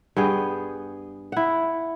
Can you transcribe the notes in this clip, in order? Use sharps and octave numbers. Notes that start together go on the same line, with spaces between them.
G2 B3 G#4 G5
E4 F#5